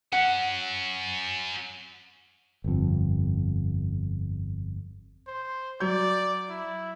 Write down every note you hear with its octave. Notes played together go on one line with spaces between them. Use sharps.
F#3 C#4 F#5
G1 F2
C5
F#3 D5 G6
E4